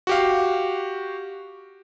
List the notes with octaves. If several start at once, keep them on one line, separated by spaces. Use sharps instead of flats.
F#4 G4 F5